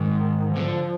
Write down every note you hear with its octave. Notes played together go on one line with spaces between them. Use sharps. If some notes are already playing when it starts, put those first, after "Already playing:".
Already playing: G#2 D#3
D3 F3